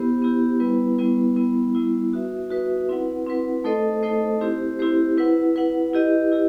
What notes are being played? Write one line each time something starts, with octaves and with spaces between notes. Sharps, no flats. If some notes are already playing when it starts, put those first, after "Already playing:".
Already playing: B3 E4 G4 C5
B3 E4 G4 C5
G3 B3 E4 B4
G3 B3 E4 B4
G3 B3 E4
G3 B3 E4
D#4 F#4 B4 E5
D#4 F#4 B4 E5
C4 E4 B4 F#5
C4 E4 B4 F#5
A3 D#4 A4 C5 D#5
A3 D#4 A4 C5 D#5
C4 E4 G4 C5
C4 E4 G4 C5
E4 B4 F#5
E4 B4 F#5
E4 G4 B4 D#5
E4 G4